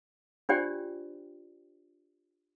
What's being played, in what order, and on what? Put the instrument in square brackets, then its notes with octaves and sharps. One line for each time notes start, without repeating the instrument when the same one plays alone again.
[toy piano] D4 F4 G4 C5 D5 G5